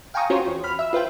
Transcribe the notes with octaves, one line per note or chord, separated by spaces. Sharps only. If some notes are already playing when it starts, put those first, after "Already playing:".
F5 G5 G#5 A#5 C#6 D#6
C#4 F4 F#4 C5 C#5
E2
B5 F6
E5 E6
F4 B4 C5 G5